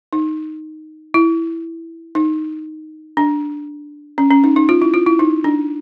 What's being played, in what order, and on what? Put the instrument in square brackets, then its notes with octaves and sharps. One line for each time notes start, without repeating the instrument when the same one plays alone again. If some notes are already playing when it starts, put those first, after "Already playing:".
[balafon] D#4
E4
D#4
D4
C#4
C#4
D#4
D#4
F4
E4
F4
E4
D#4
D4